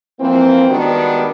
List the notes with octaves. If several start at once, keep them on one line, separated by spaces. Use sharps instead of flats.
E3 F3 A#3 C4
D#3 G3 G#3 B3 D4 F#4